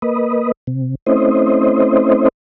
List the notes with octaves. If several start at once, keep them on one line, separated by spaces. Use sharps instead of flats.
A#3 B4 D#5
C3
A3 C4 C#4 E4 C5 D#5